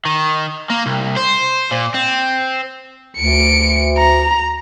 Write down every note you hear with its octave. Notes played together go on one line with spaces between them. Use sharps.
D#3
A#3
C2
C5
A#2
C4
D2 C#7 D7
A#5